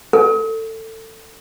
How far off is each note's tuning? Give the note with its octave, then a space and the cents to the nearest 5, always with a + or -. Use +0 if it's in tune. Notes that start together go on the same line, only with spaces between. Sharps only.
A4 +25